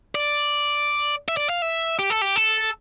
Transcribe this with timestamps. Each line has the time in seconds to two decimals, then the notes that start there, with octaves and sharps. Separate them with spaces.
0.15 D5
1.28 E5
1.37 D5
1.49 F5
1.62 E5
1.99 G4
2.10 A4
2.22 G4
2.36 A4